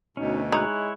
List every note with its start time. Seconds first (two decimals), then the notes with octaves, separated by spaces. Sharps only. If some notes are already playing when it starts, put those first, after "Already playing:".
0.17 D2 B2 C#4 D#4
0.52 G#3 D#4 E4 C#5 F#6